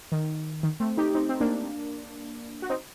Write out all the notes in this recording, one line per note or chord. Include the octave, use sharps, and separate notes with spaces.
D#3
D#3
A3 C4
D#4 G4
C4 D#4
C4
A#3 D4
F#4
C4 D#4